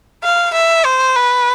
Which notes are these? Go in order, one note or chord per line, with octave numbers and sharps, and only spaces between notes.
F5
E5
C5
B4